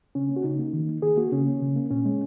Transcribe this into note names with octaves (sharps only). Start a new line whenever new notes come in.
C#3 C#4
A#3
F#4
C#3 D#4
A#3
D#3
A#3
D#3 G#4
A#3 F#4
C#3 C#4
A#3
C#3
A#3
A#2 C#4
G#3